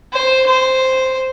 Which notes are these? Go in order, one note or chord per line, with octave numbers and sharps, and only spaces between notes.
C5
C5